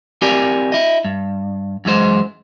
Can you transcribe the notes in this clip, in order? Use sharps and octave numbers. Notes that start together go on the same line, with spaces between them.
C4 E4 G4 A#4 D5 G#5
E4 D#5
G2
F#2 E3 G#3 C5